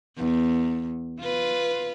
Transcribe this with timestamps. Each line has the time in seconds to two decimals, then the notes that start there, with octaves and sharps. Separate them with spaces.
0.17 E2
1.19 F4 B4